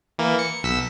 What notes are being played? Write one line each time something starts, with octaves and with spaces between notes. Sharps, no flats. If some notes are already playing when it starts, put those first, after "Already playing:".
E3 A#3
C#7
B1 E6 B6